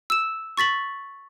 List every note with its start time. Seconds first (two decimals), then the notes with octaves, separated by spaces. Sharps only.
0.10 E6 E7
0.57 C#6 A6 B6 F#7